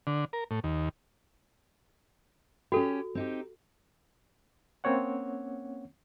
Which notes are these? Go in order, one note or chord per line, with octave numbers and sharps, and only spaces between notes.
D3
A#4
A2
D#2
C#4 F#4 G4 A4
C4 D#4 G4
A#3 C4 C#4 C#5 F#5